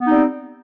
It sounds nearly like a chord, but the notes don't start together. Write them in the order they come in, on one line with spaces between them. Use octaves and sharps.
B3 D#4 C4 G3